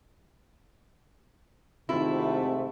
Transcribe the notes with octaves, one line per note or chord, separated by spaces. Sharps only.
G#2 C3 D#3 A3 C4 E4 F4